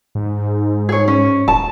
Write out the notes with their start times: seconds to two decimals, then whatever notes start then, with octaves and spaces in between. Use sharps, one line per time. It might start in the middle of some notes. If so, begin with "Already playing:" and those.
0.15 G#2
0.89 G#4 C#5
1.08 C#4
1.48 D#1 A5